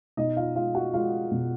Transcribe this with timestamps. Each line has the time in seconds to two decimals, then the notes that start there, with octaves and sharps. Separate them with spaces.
0.17 B2 D#4 D#5
0.37 F4 F5
0.55 G#3 F4 F5
0.75 F#4 F#5
0.94 G#3 F4 F5
1.31 B2